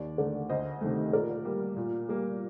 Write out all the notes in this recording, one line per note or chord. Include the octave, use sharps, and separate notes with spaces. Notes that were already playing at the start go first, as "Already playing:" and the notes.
Already playing: D#2 D5
D3 A3 A#4 D5
D2 C5 D#5
C3 D#3 A3
A#2 A#4 D5
G3 A#3
A#2
G3 A#3